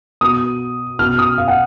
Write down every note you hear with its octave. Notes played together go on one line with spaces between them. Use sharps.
B2 D#6
B2 F6
D#6
F5
F#5